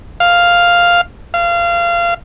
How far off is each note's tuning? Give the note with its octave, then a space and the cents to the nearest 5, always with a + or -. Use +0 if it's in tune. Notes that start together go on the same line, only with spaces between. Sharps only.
F5 +0
F5 -25